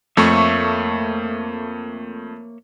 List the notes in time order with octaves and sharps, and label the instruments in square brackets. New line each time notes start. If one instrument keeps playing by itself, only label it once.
[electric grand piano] F2 A3 C#6 [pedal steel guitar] A#3 C#5 E5